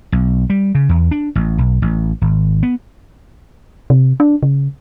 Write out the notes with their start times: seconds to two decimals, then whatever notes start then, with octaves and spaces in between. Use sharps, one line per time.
0.12 B1
0.50 G3
0.75 C#3
0.89 E2
1.11 D4
1.35 A1
1.58 B1
1.82 A1
2.21 G#1
2.63 B3
3.90 C3
4.20 D4
4.43 C#3